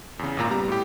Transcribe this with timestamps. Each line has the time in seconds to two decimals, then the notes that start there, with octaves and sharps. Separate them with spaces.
0.19 E2 C#3
0.37 G#1 A#2 A#5
0.50 G3 B3 G4 A#5
0.68 A2 G4